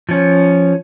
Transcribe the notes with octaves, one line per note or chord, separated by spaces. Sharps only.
F3 C#4